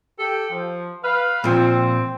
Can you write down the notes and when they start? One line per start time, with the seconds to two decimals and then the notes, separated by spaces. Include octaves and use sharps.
0.18 G4 A4 G5
0.50 F3
1.03 B4 F5
1.44 A#2 F3 C4